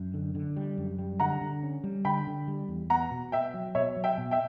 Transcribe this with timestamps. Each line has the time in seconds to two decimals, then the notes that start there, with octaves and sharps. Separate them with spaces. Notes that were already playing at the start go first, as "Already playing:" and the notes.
Already playing: F#2
0.14 D3
0.35 D3
0.57 G3
0.78 F#2
0.99 G3
1.20 D3 F#5 A#5
1.41 D3
1.63 C#4
1.84 G3
2.05 D3 G5 B5
2.27 D3
2.48 G3
2.69 E2
2.90 B3 F#5 A#5
3.11 B2
3.32 B3 E5 G5
3.54 F#3
3.75 B2 C#5 E5
3.97 F#3
4.04 E5 G5
4.18 B2
4.31 E5 G5